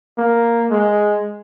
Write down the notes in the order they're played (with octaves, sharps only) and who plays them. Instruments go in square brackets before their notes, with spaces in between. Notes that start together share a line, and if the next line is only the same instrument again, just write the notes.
[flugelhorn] A#3
G#3